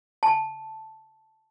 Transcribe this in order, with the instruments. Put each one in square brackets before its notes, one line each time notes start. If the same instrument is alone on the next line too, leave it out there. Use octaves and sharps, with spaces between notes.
[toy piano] A5